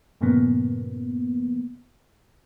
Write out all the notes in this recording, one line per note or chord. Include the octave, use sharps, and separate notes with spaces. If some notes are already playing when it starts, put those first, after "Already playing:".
G2 A#2 C#3 F3 A#3 B3